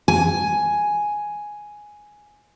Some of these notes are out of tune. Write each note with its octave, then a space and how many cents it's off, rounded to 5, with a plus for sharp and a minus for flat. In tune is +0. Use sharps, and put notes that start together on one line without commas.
G#5 +5